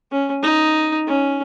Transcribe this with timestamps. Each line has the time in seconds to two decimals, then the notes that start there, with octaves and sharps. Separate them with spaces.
0.12 C#4
0.43 D#4
1.08 C#4